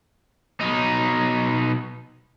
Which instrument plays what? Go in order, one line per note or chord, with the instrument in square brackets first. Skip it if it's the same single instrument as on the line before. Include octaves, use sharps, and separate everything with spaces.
[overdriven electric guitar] B2 D#4